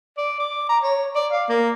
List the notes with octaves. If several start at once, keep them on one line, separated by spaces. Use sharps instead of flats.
D5
D6
A#5
C#5
D5
F5
A#3